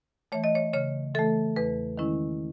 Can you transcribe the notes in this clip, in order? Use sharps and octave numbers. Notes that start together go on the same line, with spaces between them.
E3 A3 C#5
D#5
C#5
C#3 C#5
E3 A3 A4
E2 B4
D#3 G#3 C#4 E4